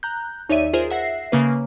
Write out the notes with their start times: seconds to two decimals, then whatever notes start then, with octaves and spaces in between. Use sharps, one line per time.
0.03 A#5 F#6 G6
0.49 D#2 D#4 C#5 D5 E5 D#7
0.73 F4 G#4 A#4 C5
0.90 E5 F#5 A#6 C7
1.32 C#3 A#3 B4